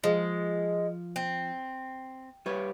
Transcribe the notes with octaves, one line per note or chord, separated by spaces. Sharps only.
F3 G#3
C4
G3 B4 C#5